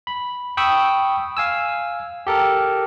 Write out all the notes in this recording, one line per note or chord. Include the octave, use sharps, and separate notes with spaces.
B5
G5 B5 C#6 D#6 E6
F5 G#5 E6
G4 A4 A#4